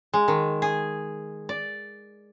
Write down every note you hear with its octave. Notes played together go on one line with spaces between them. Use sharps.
G#3
D#3
G#4
D5